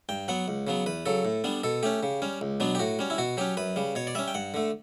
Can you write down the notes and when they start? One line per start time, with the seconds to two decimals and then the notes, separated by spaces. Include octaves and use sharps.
0.09 G2 G5
0.28 F#3 B3 F#5
0.48 C#2
0.67 C#3 F#3 B3
0.86 E2 B4
1.06 C#3 F#3 A4
1.25 A2
1.44 G3 B3 D4
1.64 B2 A4
1.83 A3 C#4 G4
2.03 C#3
2.22 G3 C#4
2.41 C#2
2.60 B2 F#3 B3 D4
2.75 G4
2.79 A2 F#4
2.99 G3 C#4
3.10 E4
3.18 B2 F#4
3.37 F#3 C#4 G4
3.57 F#2 B4
3.76 C#3 G3
3.95 B2 C#5
4.07 D5
4.15 G3 C#4 E5
4.28 G5
4.34 G2 F#5
4.54 D3 A3